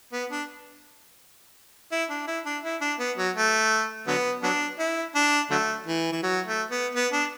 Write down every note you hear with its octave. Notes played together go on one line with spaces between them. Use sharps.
B3
D4
E4
D4
E4
D4
E4
D4
B3
F#3
A3
D3 F#3 B3
F#3 B3 D4
E4
D4
D3 F#3 A3
E3
E3
F#3
A3
B3
B3
D4